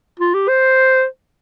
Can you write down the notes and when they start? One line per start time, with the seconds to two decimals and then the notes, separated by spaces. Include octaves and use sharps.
0.20 F4
0.34 G4
0.49 C5